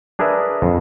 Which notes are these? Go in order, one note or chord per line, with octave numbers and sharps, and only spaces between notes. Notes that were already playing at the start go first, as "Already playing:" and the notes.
D4 G#4 A#4 B4 E5
F2